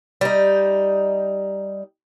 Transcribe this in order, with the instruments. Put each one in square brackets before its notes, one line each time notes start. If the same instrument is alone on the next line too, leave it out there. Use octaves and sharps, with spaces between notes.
[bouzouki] G3 D#4